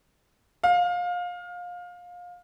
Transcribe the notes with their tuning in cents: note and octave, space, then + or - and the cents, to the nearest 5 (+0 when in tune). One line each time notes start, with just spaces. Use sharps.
F5 +25